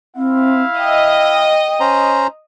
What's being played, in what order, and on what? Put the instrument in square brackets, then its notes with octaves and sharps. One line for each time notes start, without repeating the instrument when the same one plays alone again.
[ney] C4 [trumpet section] E4 E5 F5
[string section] D#5 [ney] G5
[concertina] C#4 C5 A#5